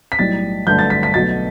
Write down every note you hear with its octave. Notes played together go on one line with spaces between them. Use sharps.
B6
B1 A2 G3 A6
G1 F#2 D3 A3 G6
A6
B6
B6
B1 B2 F#3 A3 A6